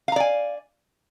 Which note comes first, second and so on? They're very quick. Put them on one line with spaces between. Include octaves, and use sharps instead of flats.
F5 A#5 D5 G#5